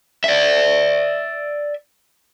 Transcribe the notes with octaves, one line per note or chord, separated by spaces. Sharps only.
D5 E5